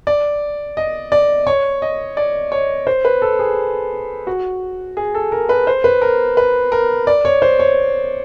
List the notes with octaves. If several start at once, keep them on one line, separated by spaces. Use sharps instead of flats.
D5
D#5
D5
C#5
D#5
D5
C#5
C5
B4
A4
G#4
F#4
G#4
A4
A#4
B4
C5
B4
A#4
B4
A#4
D5
C#5
C5
C#5